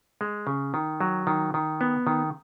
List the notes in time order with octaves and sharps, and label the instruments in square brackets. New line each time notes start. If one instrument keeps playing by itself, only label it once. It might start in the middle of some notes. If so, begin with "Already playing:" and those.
[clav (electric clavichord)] G#3
C#3
D#3
F#3
D#3
D#3
B3
D#3